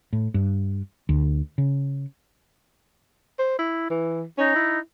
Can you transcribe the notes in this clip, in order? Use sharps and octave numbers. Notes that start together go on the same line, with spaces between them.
A2
G2
D2
C#3
C5
E4
E3
C#4 D#4
E4